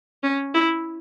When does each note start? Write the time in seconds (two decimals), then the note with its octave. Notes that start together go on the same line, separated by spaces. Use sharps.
0.23 C#4
0.54 E4